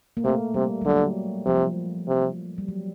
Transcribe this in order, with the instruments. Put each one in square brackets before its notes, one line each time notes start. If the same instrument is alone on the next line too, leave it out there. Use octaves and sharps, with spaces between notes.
[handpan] A#3
[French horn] C3 [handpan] A3
[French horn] C3 [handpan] G3
[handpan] G3
[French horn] D3 [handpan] F#3
[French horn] C3 [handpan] F3
[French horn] C3
[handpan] G3
F#3